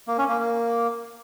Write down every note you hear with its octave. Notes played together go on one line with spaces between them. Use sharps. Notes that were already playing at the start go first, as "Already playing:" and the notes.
A#3
C#4
A#3
A#3